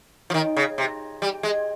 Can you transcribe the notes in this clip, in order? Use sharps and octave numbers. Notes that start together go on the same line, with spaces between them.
F3
D#3
C#3
C3
G3
G#3